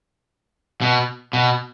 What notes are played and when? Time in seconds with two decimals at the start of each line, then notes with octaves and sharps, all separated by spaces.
0.81 B2
1.33 B2